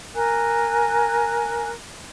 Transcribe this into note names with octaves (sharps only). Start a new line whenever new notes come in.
A#4 G#5 F#6